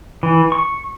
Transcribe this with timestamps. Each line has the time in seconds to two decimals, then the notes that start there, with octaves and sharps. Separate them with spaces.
0.23 E3
0.52 C#6